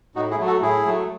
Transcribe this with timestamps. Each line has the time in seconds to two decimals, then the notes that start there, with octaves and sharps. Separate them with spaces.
0.15 A2 D#4 F#4
0.31 E4 G#4
0.39 F#3 A3
0.46 F#4 A4
0.62 A2 E4 G#4
0.85 F#3 A3